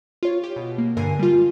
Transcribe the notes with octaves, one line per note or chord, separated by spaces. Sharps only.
F4 C#5
G4
B2
A#3
G2 D3 A#4 G#5 C7 D#7
G3 F4